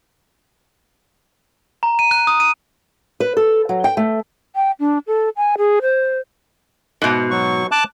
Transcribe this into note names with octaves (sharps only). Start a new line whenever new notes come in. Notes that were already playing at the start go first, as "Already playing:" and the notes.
A#5
D#7
F#6
D#6
D#7
B4
A4
F#3
G5
A3
G5
D4
A4
G#5
G#4
C5
G#2 B2
F#3 C#6
A5 D6 F#6